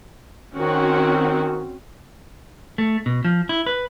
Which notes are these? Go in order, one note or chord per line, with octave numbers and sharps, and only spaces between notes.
D#3 C4 C#4 F#4
A3
B2
F3
E4
B4